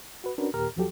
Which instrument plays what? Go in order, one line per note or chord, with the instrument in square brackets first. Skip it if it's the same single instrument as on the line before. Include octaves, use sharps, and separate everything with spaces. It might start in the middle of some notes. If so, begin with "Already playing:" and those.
[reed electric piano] F#4 B4
C#4 D4 F#4 A#4 B4
D#2 A#2 G4 A#4 A#5 F6
E2 F3 F#3 F#4 G4 A4